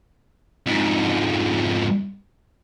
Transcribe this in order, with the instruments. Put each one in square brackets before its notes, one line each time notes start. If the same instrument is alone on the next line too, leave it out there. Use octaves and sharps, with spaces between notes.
[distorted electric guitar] F2 G#2